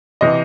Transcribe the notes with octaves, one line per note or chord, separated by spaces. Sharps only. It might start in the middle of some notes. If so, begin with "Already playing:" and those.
C3 E3 D#5